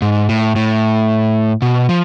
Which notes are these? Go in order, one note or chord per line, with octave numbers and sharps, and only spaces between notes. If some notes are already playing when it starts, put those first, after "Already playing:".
G#2
A2
A2
B2
F3